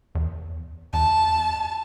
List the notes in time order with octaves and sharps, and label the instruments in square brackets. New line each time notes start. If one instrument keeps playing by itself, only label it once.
[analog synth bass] E2
[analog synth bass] E2 [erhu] A5